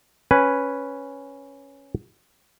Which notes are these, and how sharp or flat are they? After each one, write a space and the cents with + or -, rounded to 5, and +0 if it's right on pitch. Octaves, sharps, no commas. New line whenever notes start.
C#4 +0 B4 +0 G#5 +0